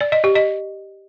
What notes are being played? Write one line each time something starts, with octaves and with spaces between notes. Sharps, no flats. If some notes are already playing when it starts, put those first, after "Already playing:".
D5
D#5
G4
D#5